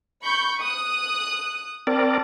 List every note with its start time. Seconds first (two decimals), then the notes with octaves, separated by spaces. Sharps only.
0.24 B5 C#6 G6
0.61 D#6 F#6
1.87 C4 A#4 D5 A5